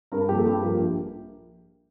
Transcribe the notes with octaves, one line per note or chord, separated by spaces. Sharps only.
G2 A#4
F3 A#3 G4
A4
G2 G4
F3 A#3
A#1